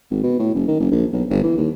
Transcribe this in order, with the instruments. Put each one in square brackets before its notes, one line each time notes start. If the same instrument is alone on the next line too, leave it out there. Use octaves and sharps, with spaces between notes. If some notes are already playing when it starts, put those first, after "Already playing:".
[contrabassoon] G#1
B2
A2
F#1
D#3
F#1
A#1
B1
G1
E3
D#2